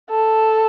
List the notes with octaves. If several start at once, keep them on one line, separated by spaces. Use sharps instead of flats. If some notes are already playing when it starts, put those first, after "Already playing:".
A4